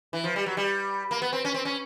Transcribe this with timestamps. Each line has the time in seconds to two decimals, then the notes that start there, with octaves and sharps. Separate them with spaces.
0.13 E3
0.24 F3
0.36 G3
0.46 F#3
0.57 G3
1.11 A#3
1.22 B3
1.33 C4
1.45 C#4
1.54 C4
1.65 C#4